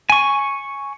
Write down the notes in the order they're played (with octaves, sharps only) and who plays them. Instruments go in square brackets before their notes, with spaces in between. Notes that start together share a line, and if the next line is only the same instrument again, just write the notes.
[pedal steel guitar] G#5 C#6